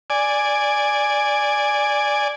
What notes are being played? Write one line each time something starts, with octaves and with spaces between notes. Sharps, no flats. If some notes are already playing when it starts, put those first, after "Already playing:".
D5 G#5